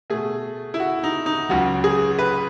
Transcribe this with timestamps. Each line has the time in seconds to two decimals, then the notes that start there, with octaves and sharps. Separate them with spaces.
0.10 B2 A3 G#4
0.74 E4
0.80 F#4
1.04 D#4
1.26 D#4
1.49 C#2 C#3 F#3 F#4
1.84 G#4
2.18 B4